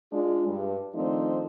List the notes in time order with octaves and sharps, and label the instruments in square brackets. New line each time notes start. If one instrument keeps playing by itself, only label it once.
[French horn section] G#3 D4 F4
G2
D#3 F3 A3 C4 D4 D#4